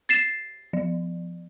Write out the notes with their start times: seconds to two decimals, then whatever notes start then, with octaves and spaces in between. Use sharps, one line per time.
0.09 A6 C7 E7
0.73 F3